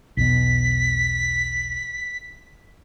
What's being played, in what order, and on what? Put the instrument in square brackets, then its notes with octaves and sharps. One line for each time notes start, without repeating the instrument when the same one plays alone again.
[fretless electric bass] B1 E2 B2 [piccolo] B6